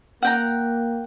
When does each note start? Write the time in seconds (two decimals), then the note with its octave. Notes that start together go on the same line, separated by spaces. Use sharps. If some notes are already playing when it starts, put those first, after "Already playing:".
0.23 A#3 F#5 G5 A#5